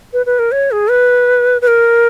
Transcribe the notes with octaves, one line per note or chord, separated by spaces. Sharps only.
B4
B4
A#4
C#5
G#4
B4
B4
A#4